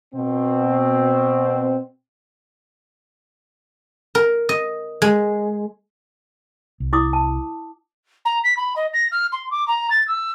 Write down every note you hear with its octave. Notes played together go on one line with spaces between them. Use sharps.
B2 C4
A#4
D#5
G#3
C2
E4 D6 D#6
A5
A#5
B6
B5
D#5
A#6
F6
C6
D6
A#5
A6
E6